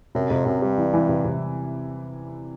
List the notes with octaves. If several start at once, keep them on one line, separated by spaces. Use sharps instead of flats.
F#2 C3
F2 C3
F#2 C3
G2 G3
E3
E3
C3
C3